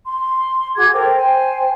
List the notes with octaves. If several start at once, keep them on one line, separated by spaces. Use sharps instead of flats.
C6
F#4 G#4 D6 G#6
A4 A#4 C5 G5
C5 G5 G#5